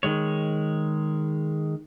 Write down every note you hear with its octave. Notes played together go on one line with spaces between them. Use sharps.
D#3 G#3 C#5